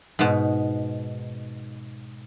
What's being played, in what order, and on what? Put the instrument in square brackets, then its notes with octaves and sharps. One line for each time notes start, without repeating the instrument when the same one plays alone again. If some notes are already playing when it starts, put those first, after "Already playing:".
[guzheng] G#2 B2